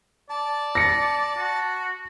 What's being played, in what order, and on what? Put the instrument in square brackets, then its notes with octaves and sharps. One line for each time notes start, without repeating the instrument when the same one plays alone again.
[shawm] D5 [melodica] A5
[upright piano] A#6 C#7
[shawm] F#4